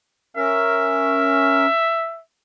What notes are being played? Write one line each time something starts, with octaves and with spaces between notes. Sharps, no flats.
C#4 A#4 E5